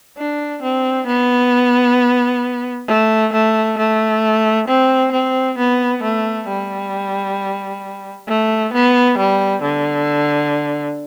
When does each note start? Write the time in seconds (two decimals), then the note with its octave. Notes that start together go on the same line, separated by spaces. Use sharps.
0.17 D4
0.62 C4
1.07 B3
2.87 A3
3.33 A3
3.78 A3
4.68 C4
5.12 C4
5.58 B3
6.03 A3
6.48 G3
8.28 A3
8.73 B3
9.18 G3
9.63 D3